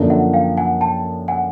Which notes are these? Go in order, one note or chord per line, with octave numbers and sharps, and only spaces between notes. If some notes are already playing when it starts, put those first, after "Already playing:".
Already playing: F#2 D3 F3 A#3 D4
E5 F#5
F5 G5
F#5 G#5
G5 A5
F#5 G#5